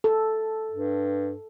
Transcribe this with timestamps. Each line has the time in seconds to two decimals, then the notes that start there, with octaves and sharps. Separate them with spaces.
0.04 A4
0.71 G2